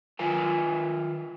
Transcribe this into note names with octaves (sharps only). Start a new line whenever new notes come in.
D#3 F4 A#4 B4 G#5